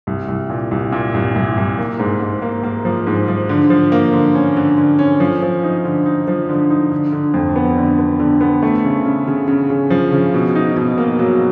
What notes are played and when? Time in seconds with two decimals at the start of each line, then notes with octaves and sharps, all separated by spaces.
0.07 C2
0.28 C2
0.50 A#2
0.71 C2
0.92 A#2
1.14 C2
1.36 C2
1.57 C2
1.78 A#3
2.00 G#2
2.21 G#2
2.42 A#3
2.63 A#3
2.85 F3
3.07 G#2
3.28 F3
3.49 D3
3.70 F3
3.92 A#3
4.13 D3
4.35 C#4
4.57 D3
4.78 D3
4.99 C#4
5.20 F3
5.42 F3
5.63 D#4
5.85 D3
6.06 D#4
6.28 F3
6.49 D3
6.70 D#4
6.92 D3
7.13 D3
7.34 F2
7.56 B3
7.78 D3
7.99 B3
8.20 D3
8.41 B3
8.63 A3
8.85 C#3
9.06 C#3
9.27 C#3
9.48 C#3
9.70 C#3
9.90 F3
10.12 C#3
10.34 B2
10.55 D#4
10.77 B2
10.98 A#3
11.19 F#3